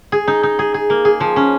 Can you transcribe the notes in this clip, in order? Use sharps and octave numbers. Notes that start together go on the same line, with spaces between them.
G#4
D#4
D#4
G#4
G#4
A#3
G#4
F3
C#4